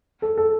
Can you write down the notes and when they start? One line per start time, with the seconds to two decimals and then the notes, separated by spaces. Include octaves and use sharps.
0.22 A4
0.37 A4